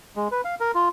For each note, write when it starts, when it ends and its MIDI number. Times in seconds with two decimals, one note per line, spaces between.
0.16 0.28 56
0.31 0.41 71
0.45 0.55 77
0.60 0.72 70
0.75 0.89 65